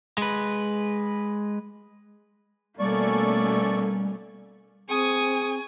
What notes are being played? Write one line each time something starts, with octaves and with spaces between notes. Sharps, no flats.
G#3 B4
B2 G3 A3 A#3 C#4 A4 D5 C#6
C4 G#4 G#5 C#6 D#6